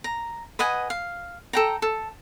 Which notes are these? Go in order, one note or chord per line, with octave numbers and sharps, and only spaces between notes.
A#5
B4 D#5 F#5 G#5
F5
A4 G5 A#5
A4